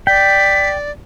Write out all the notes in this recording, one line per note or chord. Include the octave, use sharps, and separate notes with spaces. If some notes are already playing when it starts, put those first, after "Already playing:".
D5 G5 B6